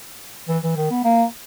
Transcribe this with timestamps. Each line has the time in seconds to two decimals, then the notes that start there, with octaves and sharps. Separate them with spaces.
0.49 E3
0.63 E3
0.76 D#3
0.91 B3
1.04 A#3